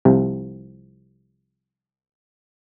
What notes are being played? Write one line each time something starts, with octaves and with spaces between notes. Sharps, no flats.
C2 C3 F3